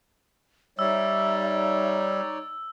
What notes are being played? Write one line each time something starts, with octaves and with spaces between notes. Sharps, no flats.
G3 D#4 C#5 D5 E5 E6